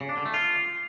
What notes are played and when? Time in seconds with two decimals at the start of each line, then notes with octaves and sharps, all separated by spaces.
0.01 C#3
0.09 D4
0.17 D3
0.26 A3
0.34 F4